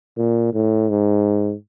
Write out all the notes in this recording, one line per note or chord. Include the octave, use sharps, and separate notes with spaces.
A#2
A2
G#2